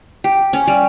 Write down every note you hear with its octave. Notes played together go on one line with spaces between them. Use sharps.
G4
C#4
G3